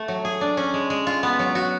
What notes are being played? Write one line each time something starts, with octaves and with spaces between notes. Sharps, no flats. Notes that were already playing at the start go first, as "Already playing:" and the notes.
Already playing: A3
F#3
G#4
D4
C#4
G#3
G#3
F4
B3
F#3
F#4